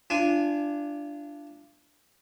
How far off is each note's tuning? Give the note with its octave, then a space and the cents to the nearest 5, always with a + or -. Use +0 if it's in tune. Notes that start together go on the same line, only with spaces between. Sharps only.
D4 +0 F4 -30 G#5 +0